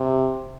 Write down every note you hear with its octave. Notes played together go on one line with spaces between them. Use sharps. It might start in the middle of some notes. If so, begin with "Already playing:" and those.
Already playing: C3